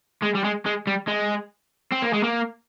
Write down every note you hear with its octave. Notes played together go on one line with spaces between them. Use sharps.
G#3
G3
G#3
G#3
G3
G#3
C4
A#3
G#3
A#3